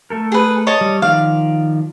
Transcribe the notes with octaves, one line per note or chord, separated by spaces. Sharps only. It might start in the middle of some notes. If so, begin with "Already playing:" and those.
A3 A4 A#4
G#4 B4
C#5 D#5 A5
G3
D#3 F3 D5 F5